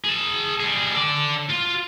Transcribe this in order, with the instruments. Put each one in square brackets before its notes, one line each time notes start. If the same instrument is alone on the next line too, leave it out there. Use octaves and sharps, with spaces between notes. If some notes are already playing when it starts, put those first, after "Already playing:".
[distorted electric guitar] G#4 A5
G3 G#4
A4 D5
F4